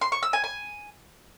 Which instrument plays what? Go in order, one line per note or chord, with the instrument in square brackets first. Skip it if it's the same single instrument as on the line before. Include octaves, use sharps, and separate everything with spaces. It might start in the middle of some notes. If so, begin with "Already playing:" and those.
[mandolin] C6
C#6
E6
G#5
G#5